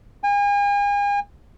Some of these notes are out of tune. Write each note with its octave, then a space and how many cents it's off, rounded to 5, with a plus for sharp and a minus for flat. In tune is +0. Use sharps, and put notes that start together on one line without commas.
G#5 -40